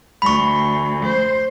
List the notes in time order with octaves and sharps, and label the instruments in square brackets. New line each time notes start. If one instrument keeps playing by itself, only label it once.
[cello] D2 [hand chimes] B5 C#6
[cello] C5